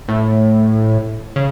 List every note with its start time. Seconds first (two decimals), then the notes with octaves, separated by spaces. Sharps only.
0.08 A2
1.36 C#3